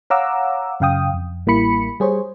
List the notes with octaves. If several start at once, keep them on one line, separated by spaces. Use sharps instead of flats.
C#5 F5 F#5 A#5 D6 E6
F#2 C#3 F5 G5 D#6
F2
A1 G3 A#3 E4 B5 C#7
G3 G#4 C5 C#5